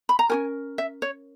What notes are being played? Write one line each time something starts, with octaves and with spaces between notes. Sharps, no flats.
B5
A#5
C#4 F#4 A#4 G#5
E5
C#5